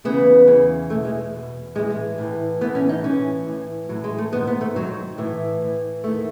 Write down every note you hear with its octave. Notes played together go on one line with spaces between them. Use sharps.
E2 C#3 E3 B3
E2 C#3 E3
E2 B2 A3
G#3
E2 B2
A2 E3 G#3
G#3
A2 E3
A2 E3 B3
C#4
D#4
A2 E3 C#4
A2 E3
A2 E3 F#3
G#3
A3
G#2 D#3 B3
B3
A3
G#2 D#3 F#3
A2 E3
A2 E3
E2 D#3 A3